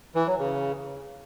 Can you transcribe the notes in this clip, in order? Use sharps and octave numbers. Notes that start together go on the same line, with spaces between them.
E3
F#3
C#3